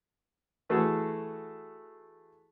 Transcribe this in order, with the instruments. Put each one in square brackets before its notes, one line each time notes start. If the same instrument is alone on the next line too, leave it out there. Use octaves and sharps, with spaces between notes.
[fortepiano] E3 A3 F#4 G#4 A4